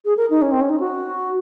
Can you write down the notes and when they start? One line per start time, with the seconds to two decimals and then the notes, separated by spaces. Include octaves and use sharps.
0.05 G#4
0.17 A#4
0.30 D#4
0.42 C#4
0.52 C4
0.61 C#4
0.69 D#4
0.80 F#4